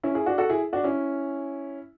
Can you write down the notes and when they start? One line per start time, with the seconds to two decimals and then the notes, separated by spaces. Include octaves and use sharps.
0.03 C#4 E4
0.15 E4 G#4
0.26 D4 F#4
0.38 F#4 A4
0.50 E4 G#4
0.73 D4 F#4
0.84 C#4 E4